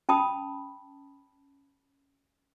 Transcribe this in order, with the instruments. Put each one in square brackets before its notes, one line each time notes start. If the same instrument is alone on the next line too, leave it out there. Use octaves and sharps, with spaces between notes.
[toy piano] C#4 A5 B5 D#6